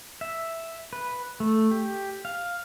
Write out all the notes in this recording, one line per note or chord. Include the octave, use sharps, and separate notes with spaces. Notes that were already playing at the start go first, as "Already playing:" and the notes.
E5
B4
A3
G4
F5